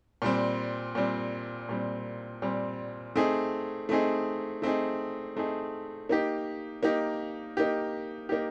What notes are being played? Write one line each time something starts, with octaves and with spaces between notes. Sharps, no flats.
A#2 G3 C4
A#2 G3 C4
A#2 G3 C4
A#2 G3 C4
A3 C4 D#4 G#4
A3 C4 D#4 G#4
A3 C4 D#4 G#4
A3 C4 D#4 G#4
A#3 D#4 G4
A#3 D#4 G4
A#3 D#4 G4
A#3 D#4 G4